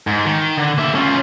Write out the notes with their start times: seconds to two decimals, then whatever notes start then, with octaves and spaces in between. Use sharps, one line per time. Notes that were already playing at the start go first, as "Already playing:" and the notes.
0.07 G#2
0.26 D#3
0.57 D3
0.78 A#3 E5
0.95 C#4 F4